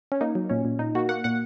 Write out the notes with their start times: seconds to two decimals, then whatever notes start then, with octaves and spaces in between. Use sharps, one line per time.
0.12 C#4
0.21 A#3 D#4
0.35 F#3
0.49 A#2 C#4
0.65 A#2
0.79 A#2 D#4
0.95 A#3 F#4
1.09 A#3 F#5
1.24 A#2 F#5